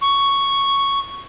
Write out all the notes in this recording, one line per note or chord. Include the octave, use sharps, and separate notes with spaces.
C#6